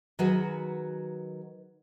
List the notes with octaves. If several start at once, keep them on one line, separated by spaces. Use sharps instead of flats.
D#3 F#3 F#4 G#4 B4 G#5